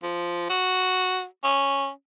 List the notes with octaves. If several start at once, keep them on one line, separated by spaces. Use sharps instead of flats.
F3
F#4
C#4